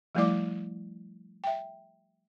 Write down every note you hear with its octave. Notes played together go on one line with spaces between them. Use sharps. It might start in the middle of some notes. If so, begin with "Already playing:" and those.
F3 G3 A3 E4 D5 D6
E5 G5